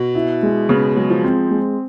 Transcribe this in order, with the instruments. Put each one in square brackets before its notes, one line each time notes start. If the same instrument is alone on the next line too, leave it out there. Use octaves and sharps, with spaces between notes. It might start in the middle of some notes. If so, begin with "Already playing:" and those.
Already playing: [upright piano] B2
[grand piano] E4
G#3
[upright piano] C#3 [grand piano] B3
[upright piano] F#3 [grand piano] G#3
[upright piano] F3
[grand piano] C4
G#3